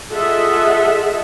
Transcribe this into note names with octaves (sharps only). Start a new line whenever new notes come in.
F4 G#4 A4 D#5 E5 F#5